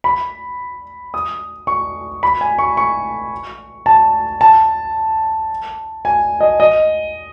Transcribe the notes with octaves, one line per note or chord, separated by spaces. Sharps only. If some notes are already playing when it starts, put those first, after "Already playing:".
B5
D#6
C#6
B5
G#5
C#6
C#6
A5
A5
G#5
D#5
D#5